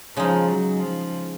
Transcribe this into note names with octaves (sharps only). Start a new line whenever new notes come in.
C#3 F3 G#3 D#4
F#3
F3